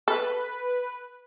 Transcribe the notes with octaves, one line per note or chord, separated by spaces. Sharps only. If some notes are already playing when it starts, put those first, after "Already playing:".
A4 B4